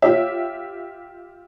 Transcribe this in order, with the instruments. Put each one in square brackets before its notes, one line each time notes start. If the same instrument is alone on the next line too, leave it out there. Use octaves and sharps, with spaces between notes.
[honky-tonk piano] F4 G4 E5 [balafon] C#5